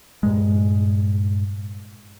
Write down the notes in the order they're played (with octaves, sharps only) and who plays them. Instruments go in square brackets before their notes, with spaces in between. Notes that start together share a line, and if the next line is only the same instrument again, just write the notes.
[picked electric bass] G2 A#2 G#3